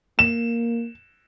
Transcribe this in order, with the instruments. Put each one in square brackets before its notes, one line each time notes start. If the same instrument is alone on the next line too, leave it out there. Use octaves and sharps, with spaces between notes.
[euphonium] A#3 [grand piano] E7